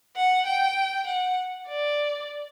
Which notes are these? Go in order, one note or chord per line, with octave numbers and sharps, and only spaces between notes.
F#5
G5
F#5
D5